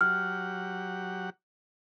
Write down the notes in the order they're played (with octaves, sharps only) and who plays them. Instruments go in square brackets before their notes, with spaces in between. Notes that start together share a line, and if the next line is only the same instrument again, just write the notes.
[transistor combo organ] F#3 G4 F#5 [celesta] F6